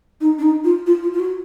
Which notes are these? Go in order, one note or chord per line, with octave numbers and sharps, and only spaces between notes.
D#4
D4
D#4
F4
F4
F4
F4
F#4